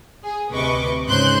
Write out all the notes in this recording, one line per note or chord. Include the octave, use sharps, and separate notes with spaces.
G#4
D2 C3 B4 D#5 C#6 D6
G#2 C#3 C5 C6 F#6 G6